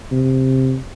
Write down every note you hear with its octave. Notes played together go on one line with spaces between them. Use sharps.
C3